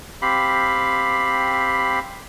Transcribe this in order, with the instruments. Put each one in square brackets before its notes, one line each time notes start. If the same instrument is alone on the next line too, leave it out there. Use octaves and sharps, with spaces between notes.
[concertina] C4 G4 F5 B5